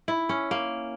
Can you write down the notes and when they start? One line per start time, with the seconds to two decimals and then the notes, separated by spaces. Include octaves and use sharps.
0.08 E4
0.29 C#4
0.51 A#3